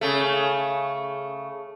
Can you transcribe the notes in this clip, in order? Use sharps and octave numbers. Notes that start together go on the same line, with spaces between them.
C#3 A3